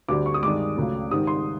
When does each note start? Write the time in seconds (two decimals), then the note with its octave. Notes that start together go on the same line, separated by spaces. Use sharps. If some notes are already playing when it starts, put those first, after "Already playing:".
0.08 D2 D3 G3 D6
0.26 C#6
0.34 D#6
0.43 G2 D#3 G#3 D6
0.77 C#2 C#3 F#3 A3
1.11 G#2 D#3 G3 D#6
1.27 C6